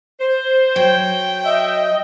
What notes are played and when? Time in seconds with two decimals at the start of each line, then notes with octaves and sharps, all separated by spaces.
0.20 C5
0.76 F#3 G5
1.44 D#5 E5